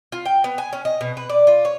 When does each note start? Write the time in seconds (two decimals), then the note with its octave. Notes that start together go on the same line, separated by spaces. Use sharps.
0.12 F4
0.25 G5
0.44 B3
0.58 G#5
0.73 C#4
0.85 D#5
1.01 B2
1.17 B4
1.30 D5
1.47 F4
1.65 C#5